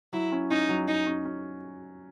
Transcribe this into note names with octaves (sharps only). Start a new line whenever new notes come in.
F#3 E4
C#4
C#4 D#4
F#3
F#3 D#4
C#4
C#4